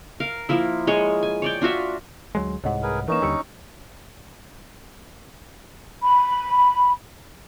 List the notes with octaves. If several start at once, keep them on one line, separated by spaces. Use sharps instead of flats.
A#4 F5
F3 A#3 E4
G#3 C#5
G#5
C#5 D5 G5
D4 F4 F#4 E5
D2 F#3 G#3 C6
C2 G#2 C#5 D#5 F#5
G#4 A#4 B4
E3 A#3 C#4 D#4 A#4 B4 E7
D#2 D3 G3 E6 C#7
B5